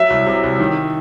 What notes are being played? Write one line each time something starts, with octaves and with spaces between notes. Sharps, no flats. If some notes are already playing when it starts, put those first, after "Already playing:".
Already playing: F#3 E5
C2
C3
C2
D#3